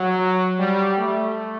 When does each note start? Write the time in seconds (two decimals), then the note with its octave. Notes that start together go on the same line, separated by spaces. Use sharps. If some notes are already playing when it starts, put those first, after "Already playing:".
Already playing: F#3
0.59 G3
0.98 A3